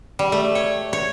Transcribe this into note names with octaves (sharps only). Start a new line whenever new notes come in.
G3
A3
C#5
C#5